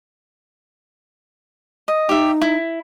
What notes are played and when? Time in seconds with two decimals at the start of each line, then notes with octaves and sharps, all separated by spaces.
1.88 D#5
2.09 D#4 G4 E5
2.42 E4